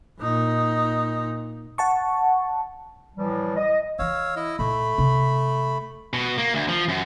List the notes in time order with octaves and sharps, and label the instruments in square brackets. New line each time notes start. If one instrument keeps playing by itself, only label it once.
[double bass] A#2 D#4
[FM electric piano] F#5 A5 C#6
[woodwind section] A2 E3 F3 G3
D#5
[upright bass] D#3 E3 [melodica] C#5 F5 E6
[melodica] E4 D#5 E6
[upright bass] A#2 [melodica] A3 B5
[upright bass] C3 D#3
[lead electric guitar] B2
A#3
D2
F3
F#2